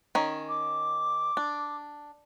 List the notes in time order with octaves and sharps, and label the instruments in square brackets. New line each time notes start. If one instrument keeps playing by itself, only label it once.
[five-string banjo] D#3 C#4
[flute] D6
[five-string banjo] D4